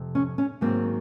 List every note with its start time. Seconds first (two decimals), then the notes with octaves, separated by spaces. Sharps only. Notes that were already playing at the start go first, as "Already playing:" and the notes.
Already playing: F2 C3
0.15 C#4
0.38 C#4
0.61 G#2 D#3 F#3 A#3 C4